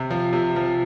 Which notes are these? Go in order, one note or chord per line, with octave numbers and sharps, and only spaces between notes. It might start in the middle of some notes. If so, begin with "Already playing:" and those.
Already playing: C3
F3
C3
F3